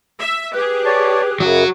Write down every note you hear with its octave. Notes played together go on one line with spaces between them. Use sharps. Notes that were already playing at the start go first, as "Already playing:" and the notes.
E5
G4 G#4 B4
C#5 D5 A5
F#2 C#3 F#3 F#4